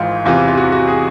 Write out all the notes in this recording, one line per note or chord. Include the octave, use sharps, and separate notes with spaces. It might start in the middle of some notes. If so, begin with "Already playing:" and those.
Already playing: G#1 G#2 E3 F4
E2 C3 E3 F4
F4
F#4
F#4
G#4